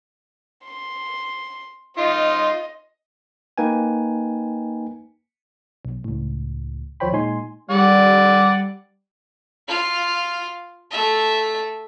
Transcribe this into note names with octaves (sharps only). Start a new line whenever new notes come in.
C6
D#4 F4 D#5 C6
A#3 D#4 B4 G5 G#5
B1
C#2 A2
D#2 F3 C5 C#5 G5 B5
A#2 G#3 D#4 G#5 C6
G3 D5 F#5
F4 F5
A3 E5